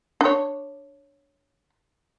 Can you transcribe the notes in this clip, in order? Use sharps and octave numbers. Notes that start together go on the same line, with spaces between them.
D4 C#5